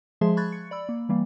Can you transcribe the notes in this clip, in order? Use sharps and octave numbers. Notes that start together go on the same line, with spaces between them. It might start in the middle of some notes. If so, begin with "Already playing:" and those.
F3 G#3 G#4 E5 C6
B5 C#6 F#6 G#6 A6
C#7
D5 B5 E6
A#3
E3 G3 A#3